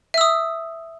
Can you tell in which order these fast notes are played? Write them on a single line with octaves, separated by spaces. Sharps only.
E5 E6 D#6